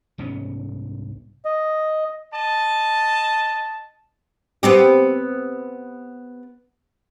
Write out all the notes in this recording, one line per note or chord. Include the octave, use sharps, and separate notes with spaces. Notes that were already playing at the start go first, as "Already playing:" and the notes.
C2 G#2 B3 C#4
D#5
D#5 A5
B3 C4 G4